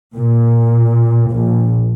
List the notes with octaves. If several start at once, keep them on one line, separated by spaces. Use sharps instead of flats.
A#2
A#1